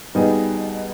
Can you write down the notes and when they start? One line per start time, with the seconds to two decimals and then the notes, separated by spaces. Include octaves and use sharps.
0.15 B2 G3 B3 D#4 G#4